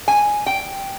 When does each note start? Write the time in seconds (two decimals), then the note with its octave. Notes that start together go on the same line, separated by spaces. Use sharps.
0.08 G#5
0.46 G5